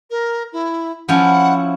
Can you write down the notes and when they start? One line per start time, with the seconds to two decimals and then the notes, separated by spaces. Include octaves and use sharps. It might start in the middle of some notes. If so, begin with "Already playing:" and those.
0.10 A#4
0.53 E4
1.08 F3 C#4 E4 F#5